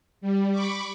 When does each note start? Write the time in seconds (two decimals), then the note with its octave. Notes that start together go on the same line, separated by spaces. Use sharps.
0.21 G3
0.51 B5 C#6 D6